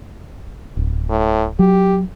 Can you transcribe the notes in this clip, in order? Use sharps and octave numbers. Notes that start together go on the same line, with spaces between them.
D1
A2
F#3 G4